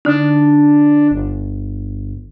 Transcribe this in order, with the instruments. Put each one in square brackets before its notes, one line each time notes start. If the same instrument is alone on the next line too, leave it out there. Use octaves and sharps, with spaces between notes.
[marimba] D3 D#4 [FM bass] D4
[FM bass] G1